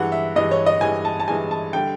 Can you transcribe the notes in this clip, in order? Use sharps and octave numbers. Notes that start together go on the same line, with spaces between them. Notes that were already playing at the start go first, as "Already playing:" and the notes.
Already playing: G2 E3 G#3 F#5
E5
G2 E3 G#3 D#5
C#5
D#5
G2 E3 G#3 G#5
A5
A5
G2 E3 G#3 G#5
A5
D3 G3 G5